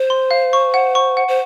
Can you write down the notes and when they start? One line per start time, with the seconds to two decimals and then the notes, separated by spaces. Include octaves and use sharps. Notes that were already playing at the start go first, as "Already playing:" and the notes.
Already playing: C5
0.10 C6
0.31 F5
0.53 C#6
0.74 F#5
0.95 C#6
1.17 F#5
1.28 C5